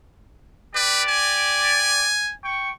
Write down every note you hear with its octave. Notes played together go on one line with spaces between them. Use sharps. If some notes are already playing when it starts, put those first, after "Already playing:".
G4 B4 D5
G#5
G5 C#6